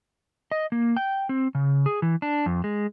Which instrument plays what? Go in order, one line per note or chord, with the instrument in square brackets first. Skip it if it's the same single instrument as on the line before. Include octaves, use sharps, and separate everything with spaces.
[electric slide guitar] D#5
A#3
G5
C4
C#3
G#4
E3
D4
F2
G#3